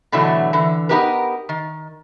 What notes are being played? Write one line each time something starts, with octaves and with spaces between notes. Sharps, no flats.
B2 D3 E3 F#3 A3
D3 E3
B3 D#4 G4 A#4 B4
D#3